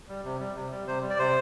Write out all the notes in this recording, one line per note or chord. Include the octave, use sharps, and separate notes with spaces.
G3
C3
G3
C3
G3
C3 C5
G3
D5
C3 C5